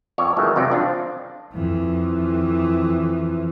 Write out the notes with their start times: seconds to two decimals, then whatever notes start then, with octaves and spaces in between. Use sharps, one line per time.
0.18 F2 C#5 D5
0.37 D#3 E3 F#3 G#3 A3 C#4
0.56 C2 F2 C3 F#3 D#4 D5
0.69 F3 C4 D4 F4
1.53 F2 E3